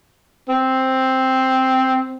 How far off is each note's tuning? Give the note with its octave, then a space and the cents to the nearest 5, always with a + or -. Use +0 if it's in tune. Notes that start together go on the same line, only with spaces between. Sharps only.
C4 +0